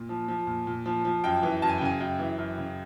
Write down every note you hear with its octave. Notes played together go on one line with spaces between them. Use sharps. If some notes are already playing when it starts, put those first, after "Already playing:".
Already playing: A#2
F3
F3
A#2
A#2
F3
F3
F#2 G5
E3
F#2 A5
G#5
G5
C#3 G#5
F#2 G5
E3
F#2
C#3